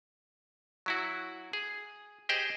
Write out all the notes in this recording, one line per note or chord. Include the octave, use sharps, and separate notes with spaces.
F#3 E4 F#4
G#4
G4 G#4 C5 D#5 G5